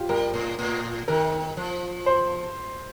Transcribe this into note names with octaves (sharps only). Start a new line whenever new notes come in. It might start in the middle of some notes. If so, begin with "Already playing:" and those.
Already playing: F4 G4
G3 A#4
A2
A2
D#3 A#4
F3
C5